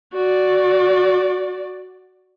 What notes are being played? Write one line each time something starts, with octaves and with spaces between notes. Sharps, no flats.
F#4 D5